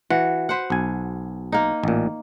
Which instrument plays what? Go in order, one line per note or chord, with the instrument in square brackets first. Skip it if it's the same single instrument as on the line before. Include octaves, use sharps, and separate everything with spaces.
[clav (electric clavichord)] E3 [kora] F#4
[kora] B4 C5 F#5
[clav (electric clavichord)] B1 G#5
[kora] A#3 D#4
[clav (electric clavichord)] A1 A#2